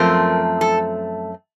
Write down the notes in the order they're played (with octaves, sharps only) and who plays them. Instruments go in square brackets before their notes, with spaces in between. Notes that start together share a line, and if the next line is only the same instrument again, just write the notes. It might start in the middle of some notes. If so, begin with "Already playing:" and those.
Already playing: [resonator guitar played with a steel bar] F#2 F3 A3 C4 A#4
A4